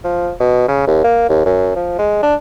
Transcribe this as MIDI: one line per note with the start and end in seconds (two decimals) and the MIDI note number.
0.04 0.32 53
0.40 0.66 47
0.68 0.86 49
0.88 1.03 39
1.04 1.27 58
1.29 1.41 39
1.46 1.74 42
1.76 1.95 53
1.99 2.23 56
2.23 2.35 62